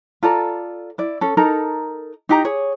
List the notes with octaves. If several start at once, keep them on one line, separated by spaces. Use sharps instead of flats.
F4 A4 D5 A#5
E4 D5
C#4 A4
D#4 A4 A#4 A#5
D#4 G4 A#5
G#4 C#5